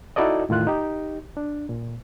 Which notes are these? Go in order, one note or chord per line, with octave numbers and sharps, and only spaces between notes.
D#4 E4 F#4 A4 D5 D#5
E2 A2 D#3 F4 F#6
D#4 G4
D4
A#2